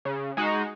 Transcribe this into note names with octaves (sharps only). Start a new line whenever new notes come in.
C#3
G#3 D#4 F#4